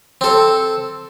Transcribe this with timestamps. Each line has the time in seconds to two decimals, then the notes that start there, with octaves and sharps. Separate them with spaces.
0.21 C4 A4